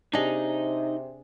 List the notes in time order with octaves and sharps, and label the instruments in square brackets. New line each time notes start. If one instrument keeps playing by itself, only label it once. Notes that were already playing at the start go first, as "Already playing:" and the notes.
[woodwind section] C3 [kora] D4 G#4 [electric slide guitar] D#4 D#5